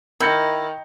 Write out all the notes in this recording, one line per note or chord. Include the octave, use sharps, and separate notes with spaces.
D#3 E4 A#4 G6 C#7